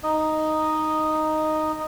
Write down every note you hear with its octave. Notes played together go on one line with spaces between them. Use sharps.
D#4 D#5